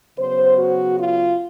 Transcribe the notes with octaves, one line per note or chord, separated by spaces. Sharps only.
C#3 F#3 B3 C5
F#4
F4